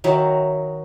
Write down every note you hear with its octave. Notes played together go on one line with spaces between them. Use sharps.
D#3 F#3 E5